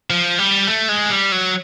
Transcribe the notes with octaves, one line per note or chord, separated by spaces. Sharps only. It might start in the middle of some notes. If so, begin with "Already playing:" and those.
F3
G3
A3
G#3
G3
F#3